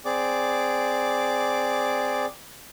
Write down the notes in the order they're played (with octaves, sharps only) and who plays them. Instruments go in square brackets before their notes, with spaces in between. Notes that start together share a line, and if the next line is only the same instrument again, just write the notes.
[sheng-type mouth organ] C4 G#4 D5 D6